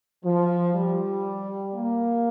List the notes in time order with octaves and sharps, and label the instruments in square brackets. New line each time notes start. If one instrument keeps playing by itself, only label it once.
[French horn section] F3
G3
A#3